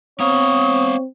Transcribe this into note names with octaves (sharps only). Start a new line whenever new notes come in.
B3 C4 C#5 F5 D#6